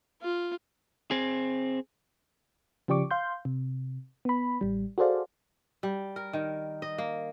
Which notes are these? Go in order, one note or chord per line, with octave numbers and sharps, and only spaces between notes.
F4
C4 G#4
C#3 F3 G4 D5 C#6 D6
F5 C6 G6
C3
B3 B5
A1 G3
F#4 G#4 A4 C5 D5 F5
G3
A#4
D#3
D#5
A#3